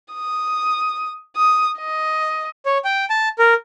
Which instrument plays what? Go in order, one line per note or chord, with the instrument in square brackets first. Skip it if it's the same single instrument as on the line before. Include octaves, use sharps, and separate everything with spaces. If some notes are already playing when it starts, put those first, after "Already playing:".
[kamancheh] D#6
D#6
D#5
[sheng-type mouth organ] C#5
G5
A5
A#4